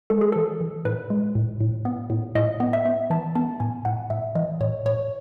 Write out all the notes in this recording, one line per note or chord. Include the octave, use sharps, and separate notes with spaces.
G#3 A4
G#4
E3 A4
E3
A2 B4
G#3
A2
A2
B3
A2
A2 D#5
B3
E5
B3
E3 A5
B3 A5
A2 G#5
A2 F#5
A2 E5
E3 D#5
A2 C#5
A2 C#5